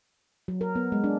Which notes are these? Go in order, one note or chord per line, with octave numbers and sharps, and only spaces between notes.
F#3
A#4
B3
G#3
D4